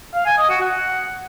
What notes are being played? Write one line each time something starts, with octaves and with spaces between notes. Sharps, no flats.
F5
G#5
D#5
F#4
F#5